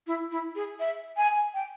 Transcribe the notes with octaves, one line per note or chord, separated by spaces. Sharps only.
E4
E4
G#4
E5
G#5
G5